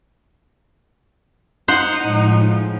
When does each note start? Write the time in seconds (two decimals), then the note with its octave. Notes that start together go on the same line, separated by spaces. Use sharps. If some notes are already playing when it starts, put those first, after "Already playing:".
1.68 D#4 C5 F#5
2.03 A2 F3 G#3